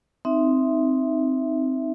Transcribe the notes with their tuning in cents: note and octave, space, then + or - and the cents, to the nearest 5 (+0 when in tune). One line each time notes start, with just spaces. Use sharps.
C4 +0 D#4 +0 E5 +0